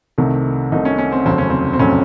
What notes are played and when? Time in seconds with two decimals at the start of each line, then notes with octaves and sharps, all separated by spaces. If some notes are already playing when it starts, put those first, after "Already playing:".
0.18 C2 C3 D#3 A3
0.72 C2 C3 D#3 A3 D#4
0.85 C#4
0.98 C#4
1.12 C4
1.25 F1 D#2 C#3 F#3 A3 C4
1.38 C#4
1.50 C4
1.73 C4
1.79 F1 C#3 F#3 A3 C#4